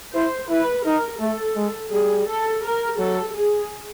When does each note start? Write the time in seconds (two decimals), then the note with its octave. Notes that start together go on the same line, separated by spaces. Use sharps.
0.14 E4 C5
0.49 E4 B4
0.85 D#4 A#4
1.20 A3 A4
1.56 G#3
1.92 G3 G#4
2.27 A4
2.64 A#4
2.98 F#3 A4
3.35 G#4